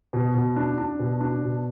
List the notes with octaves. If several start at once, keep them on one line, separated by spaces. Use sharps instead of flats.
B2
B2
D4
D4
B2
D4
B2